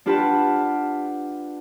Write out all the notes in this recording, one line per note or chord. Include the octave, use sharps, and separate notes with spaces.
D4 F4 G4 B4 F#5 A5